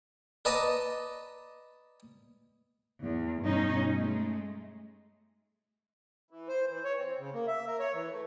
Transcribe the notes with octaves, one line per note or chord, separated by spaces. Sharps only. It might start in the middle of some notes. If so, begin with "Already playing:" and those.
B4 D5 D#5 A5 A#5
E2
G2 B2 C#4 D#4
G#3 A3
E3
C5
E3
C#5
C4
C#3
A#3
E5
A#4
C#5
E3
A3